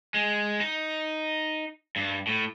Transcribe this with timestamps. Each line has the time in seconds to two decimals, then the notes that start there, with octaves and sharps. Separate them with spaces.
0.14 G#3
0.60 D#4
1.96 G2
2.27 A2